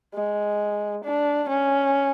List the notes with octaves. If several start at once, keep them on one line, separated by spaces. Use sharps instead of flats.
G#3
D4
C#4